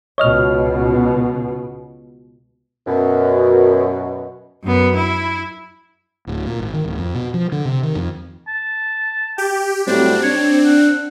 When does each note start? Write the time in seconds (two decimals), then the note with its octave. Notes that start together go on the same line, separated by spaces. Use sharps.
0.18 C#2 B2 C#5 D#5 F6
2.86 F#2 B2
4.64 F#2 B3
4.96 E4
6.27 D1
6.46 A#2
6.60 G#1
6.73 D#3
6.85 D1
6.98 F2
7.15 B2
7.34 F3
7.52 D3
7.65 C3
7.83 D#3
7.95 F2
8.48 A5
9.38 G4 G5
9.87 A2 F#3 G3 C4 D4
10.23 D4 C#5
10.65 F#5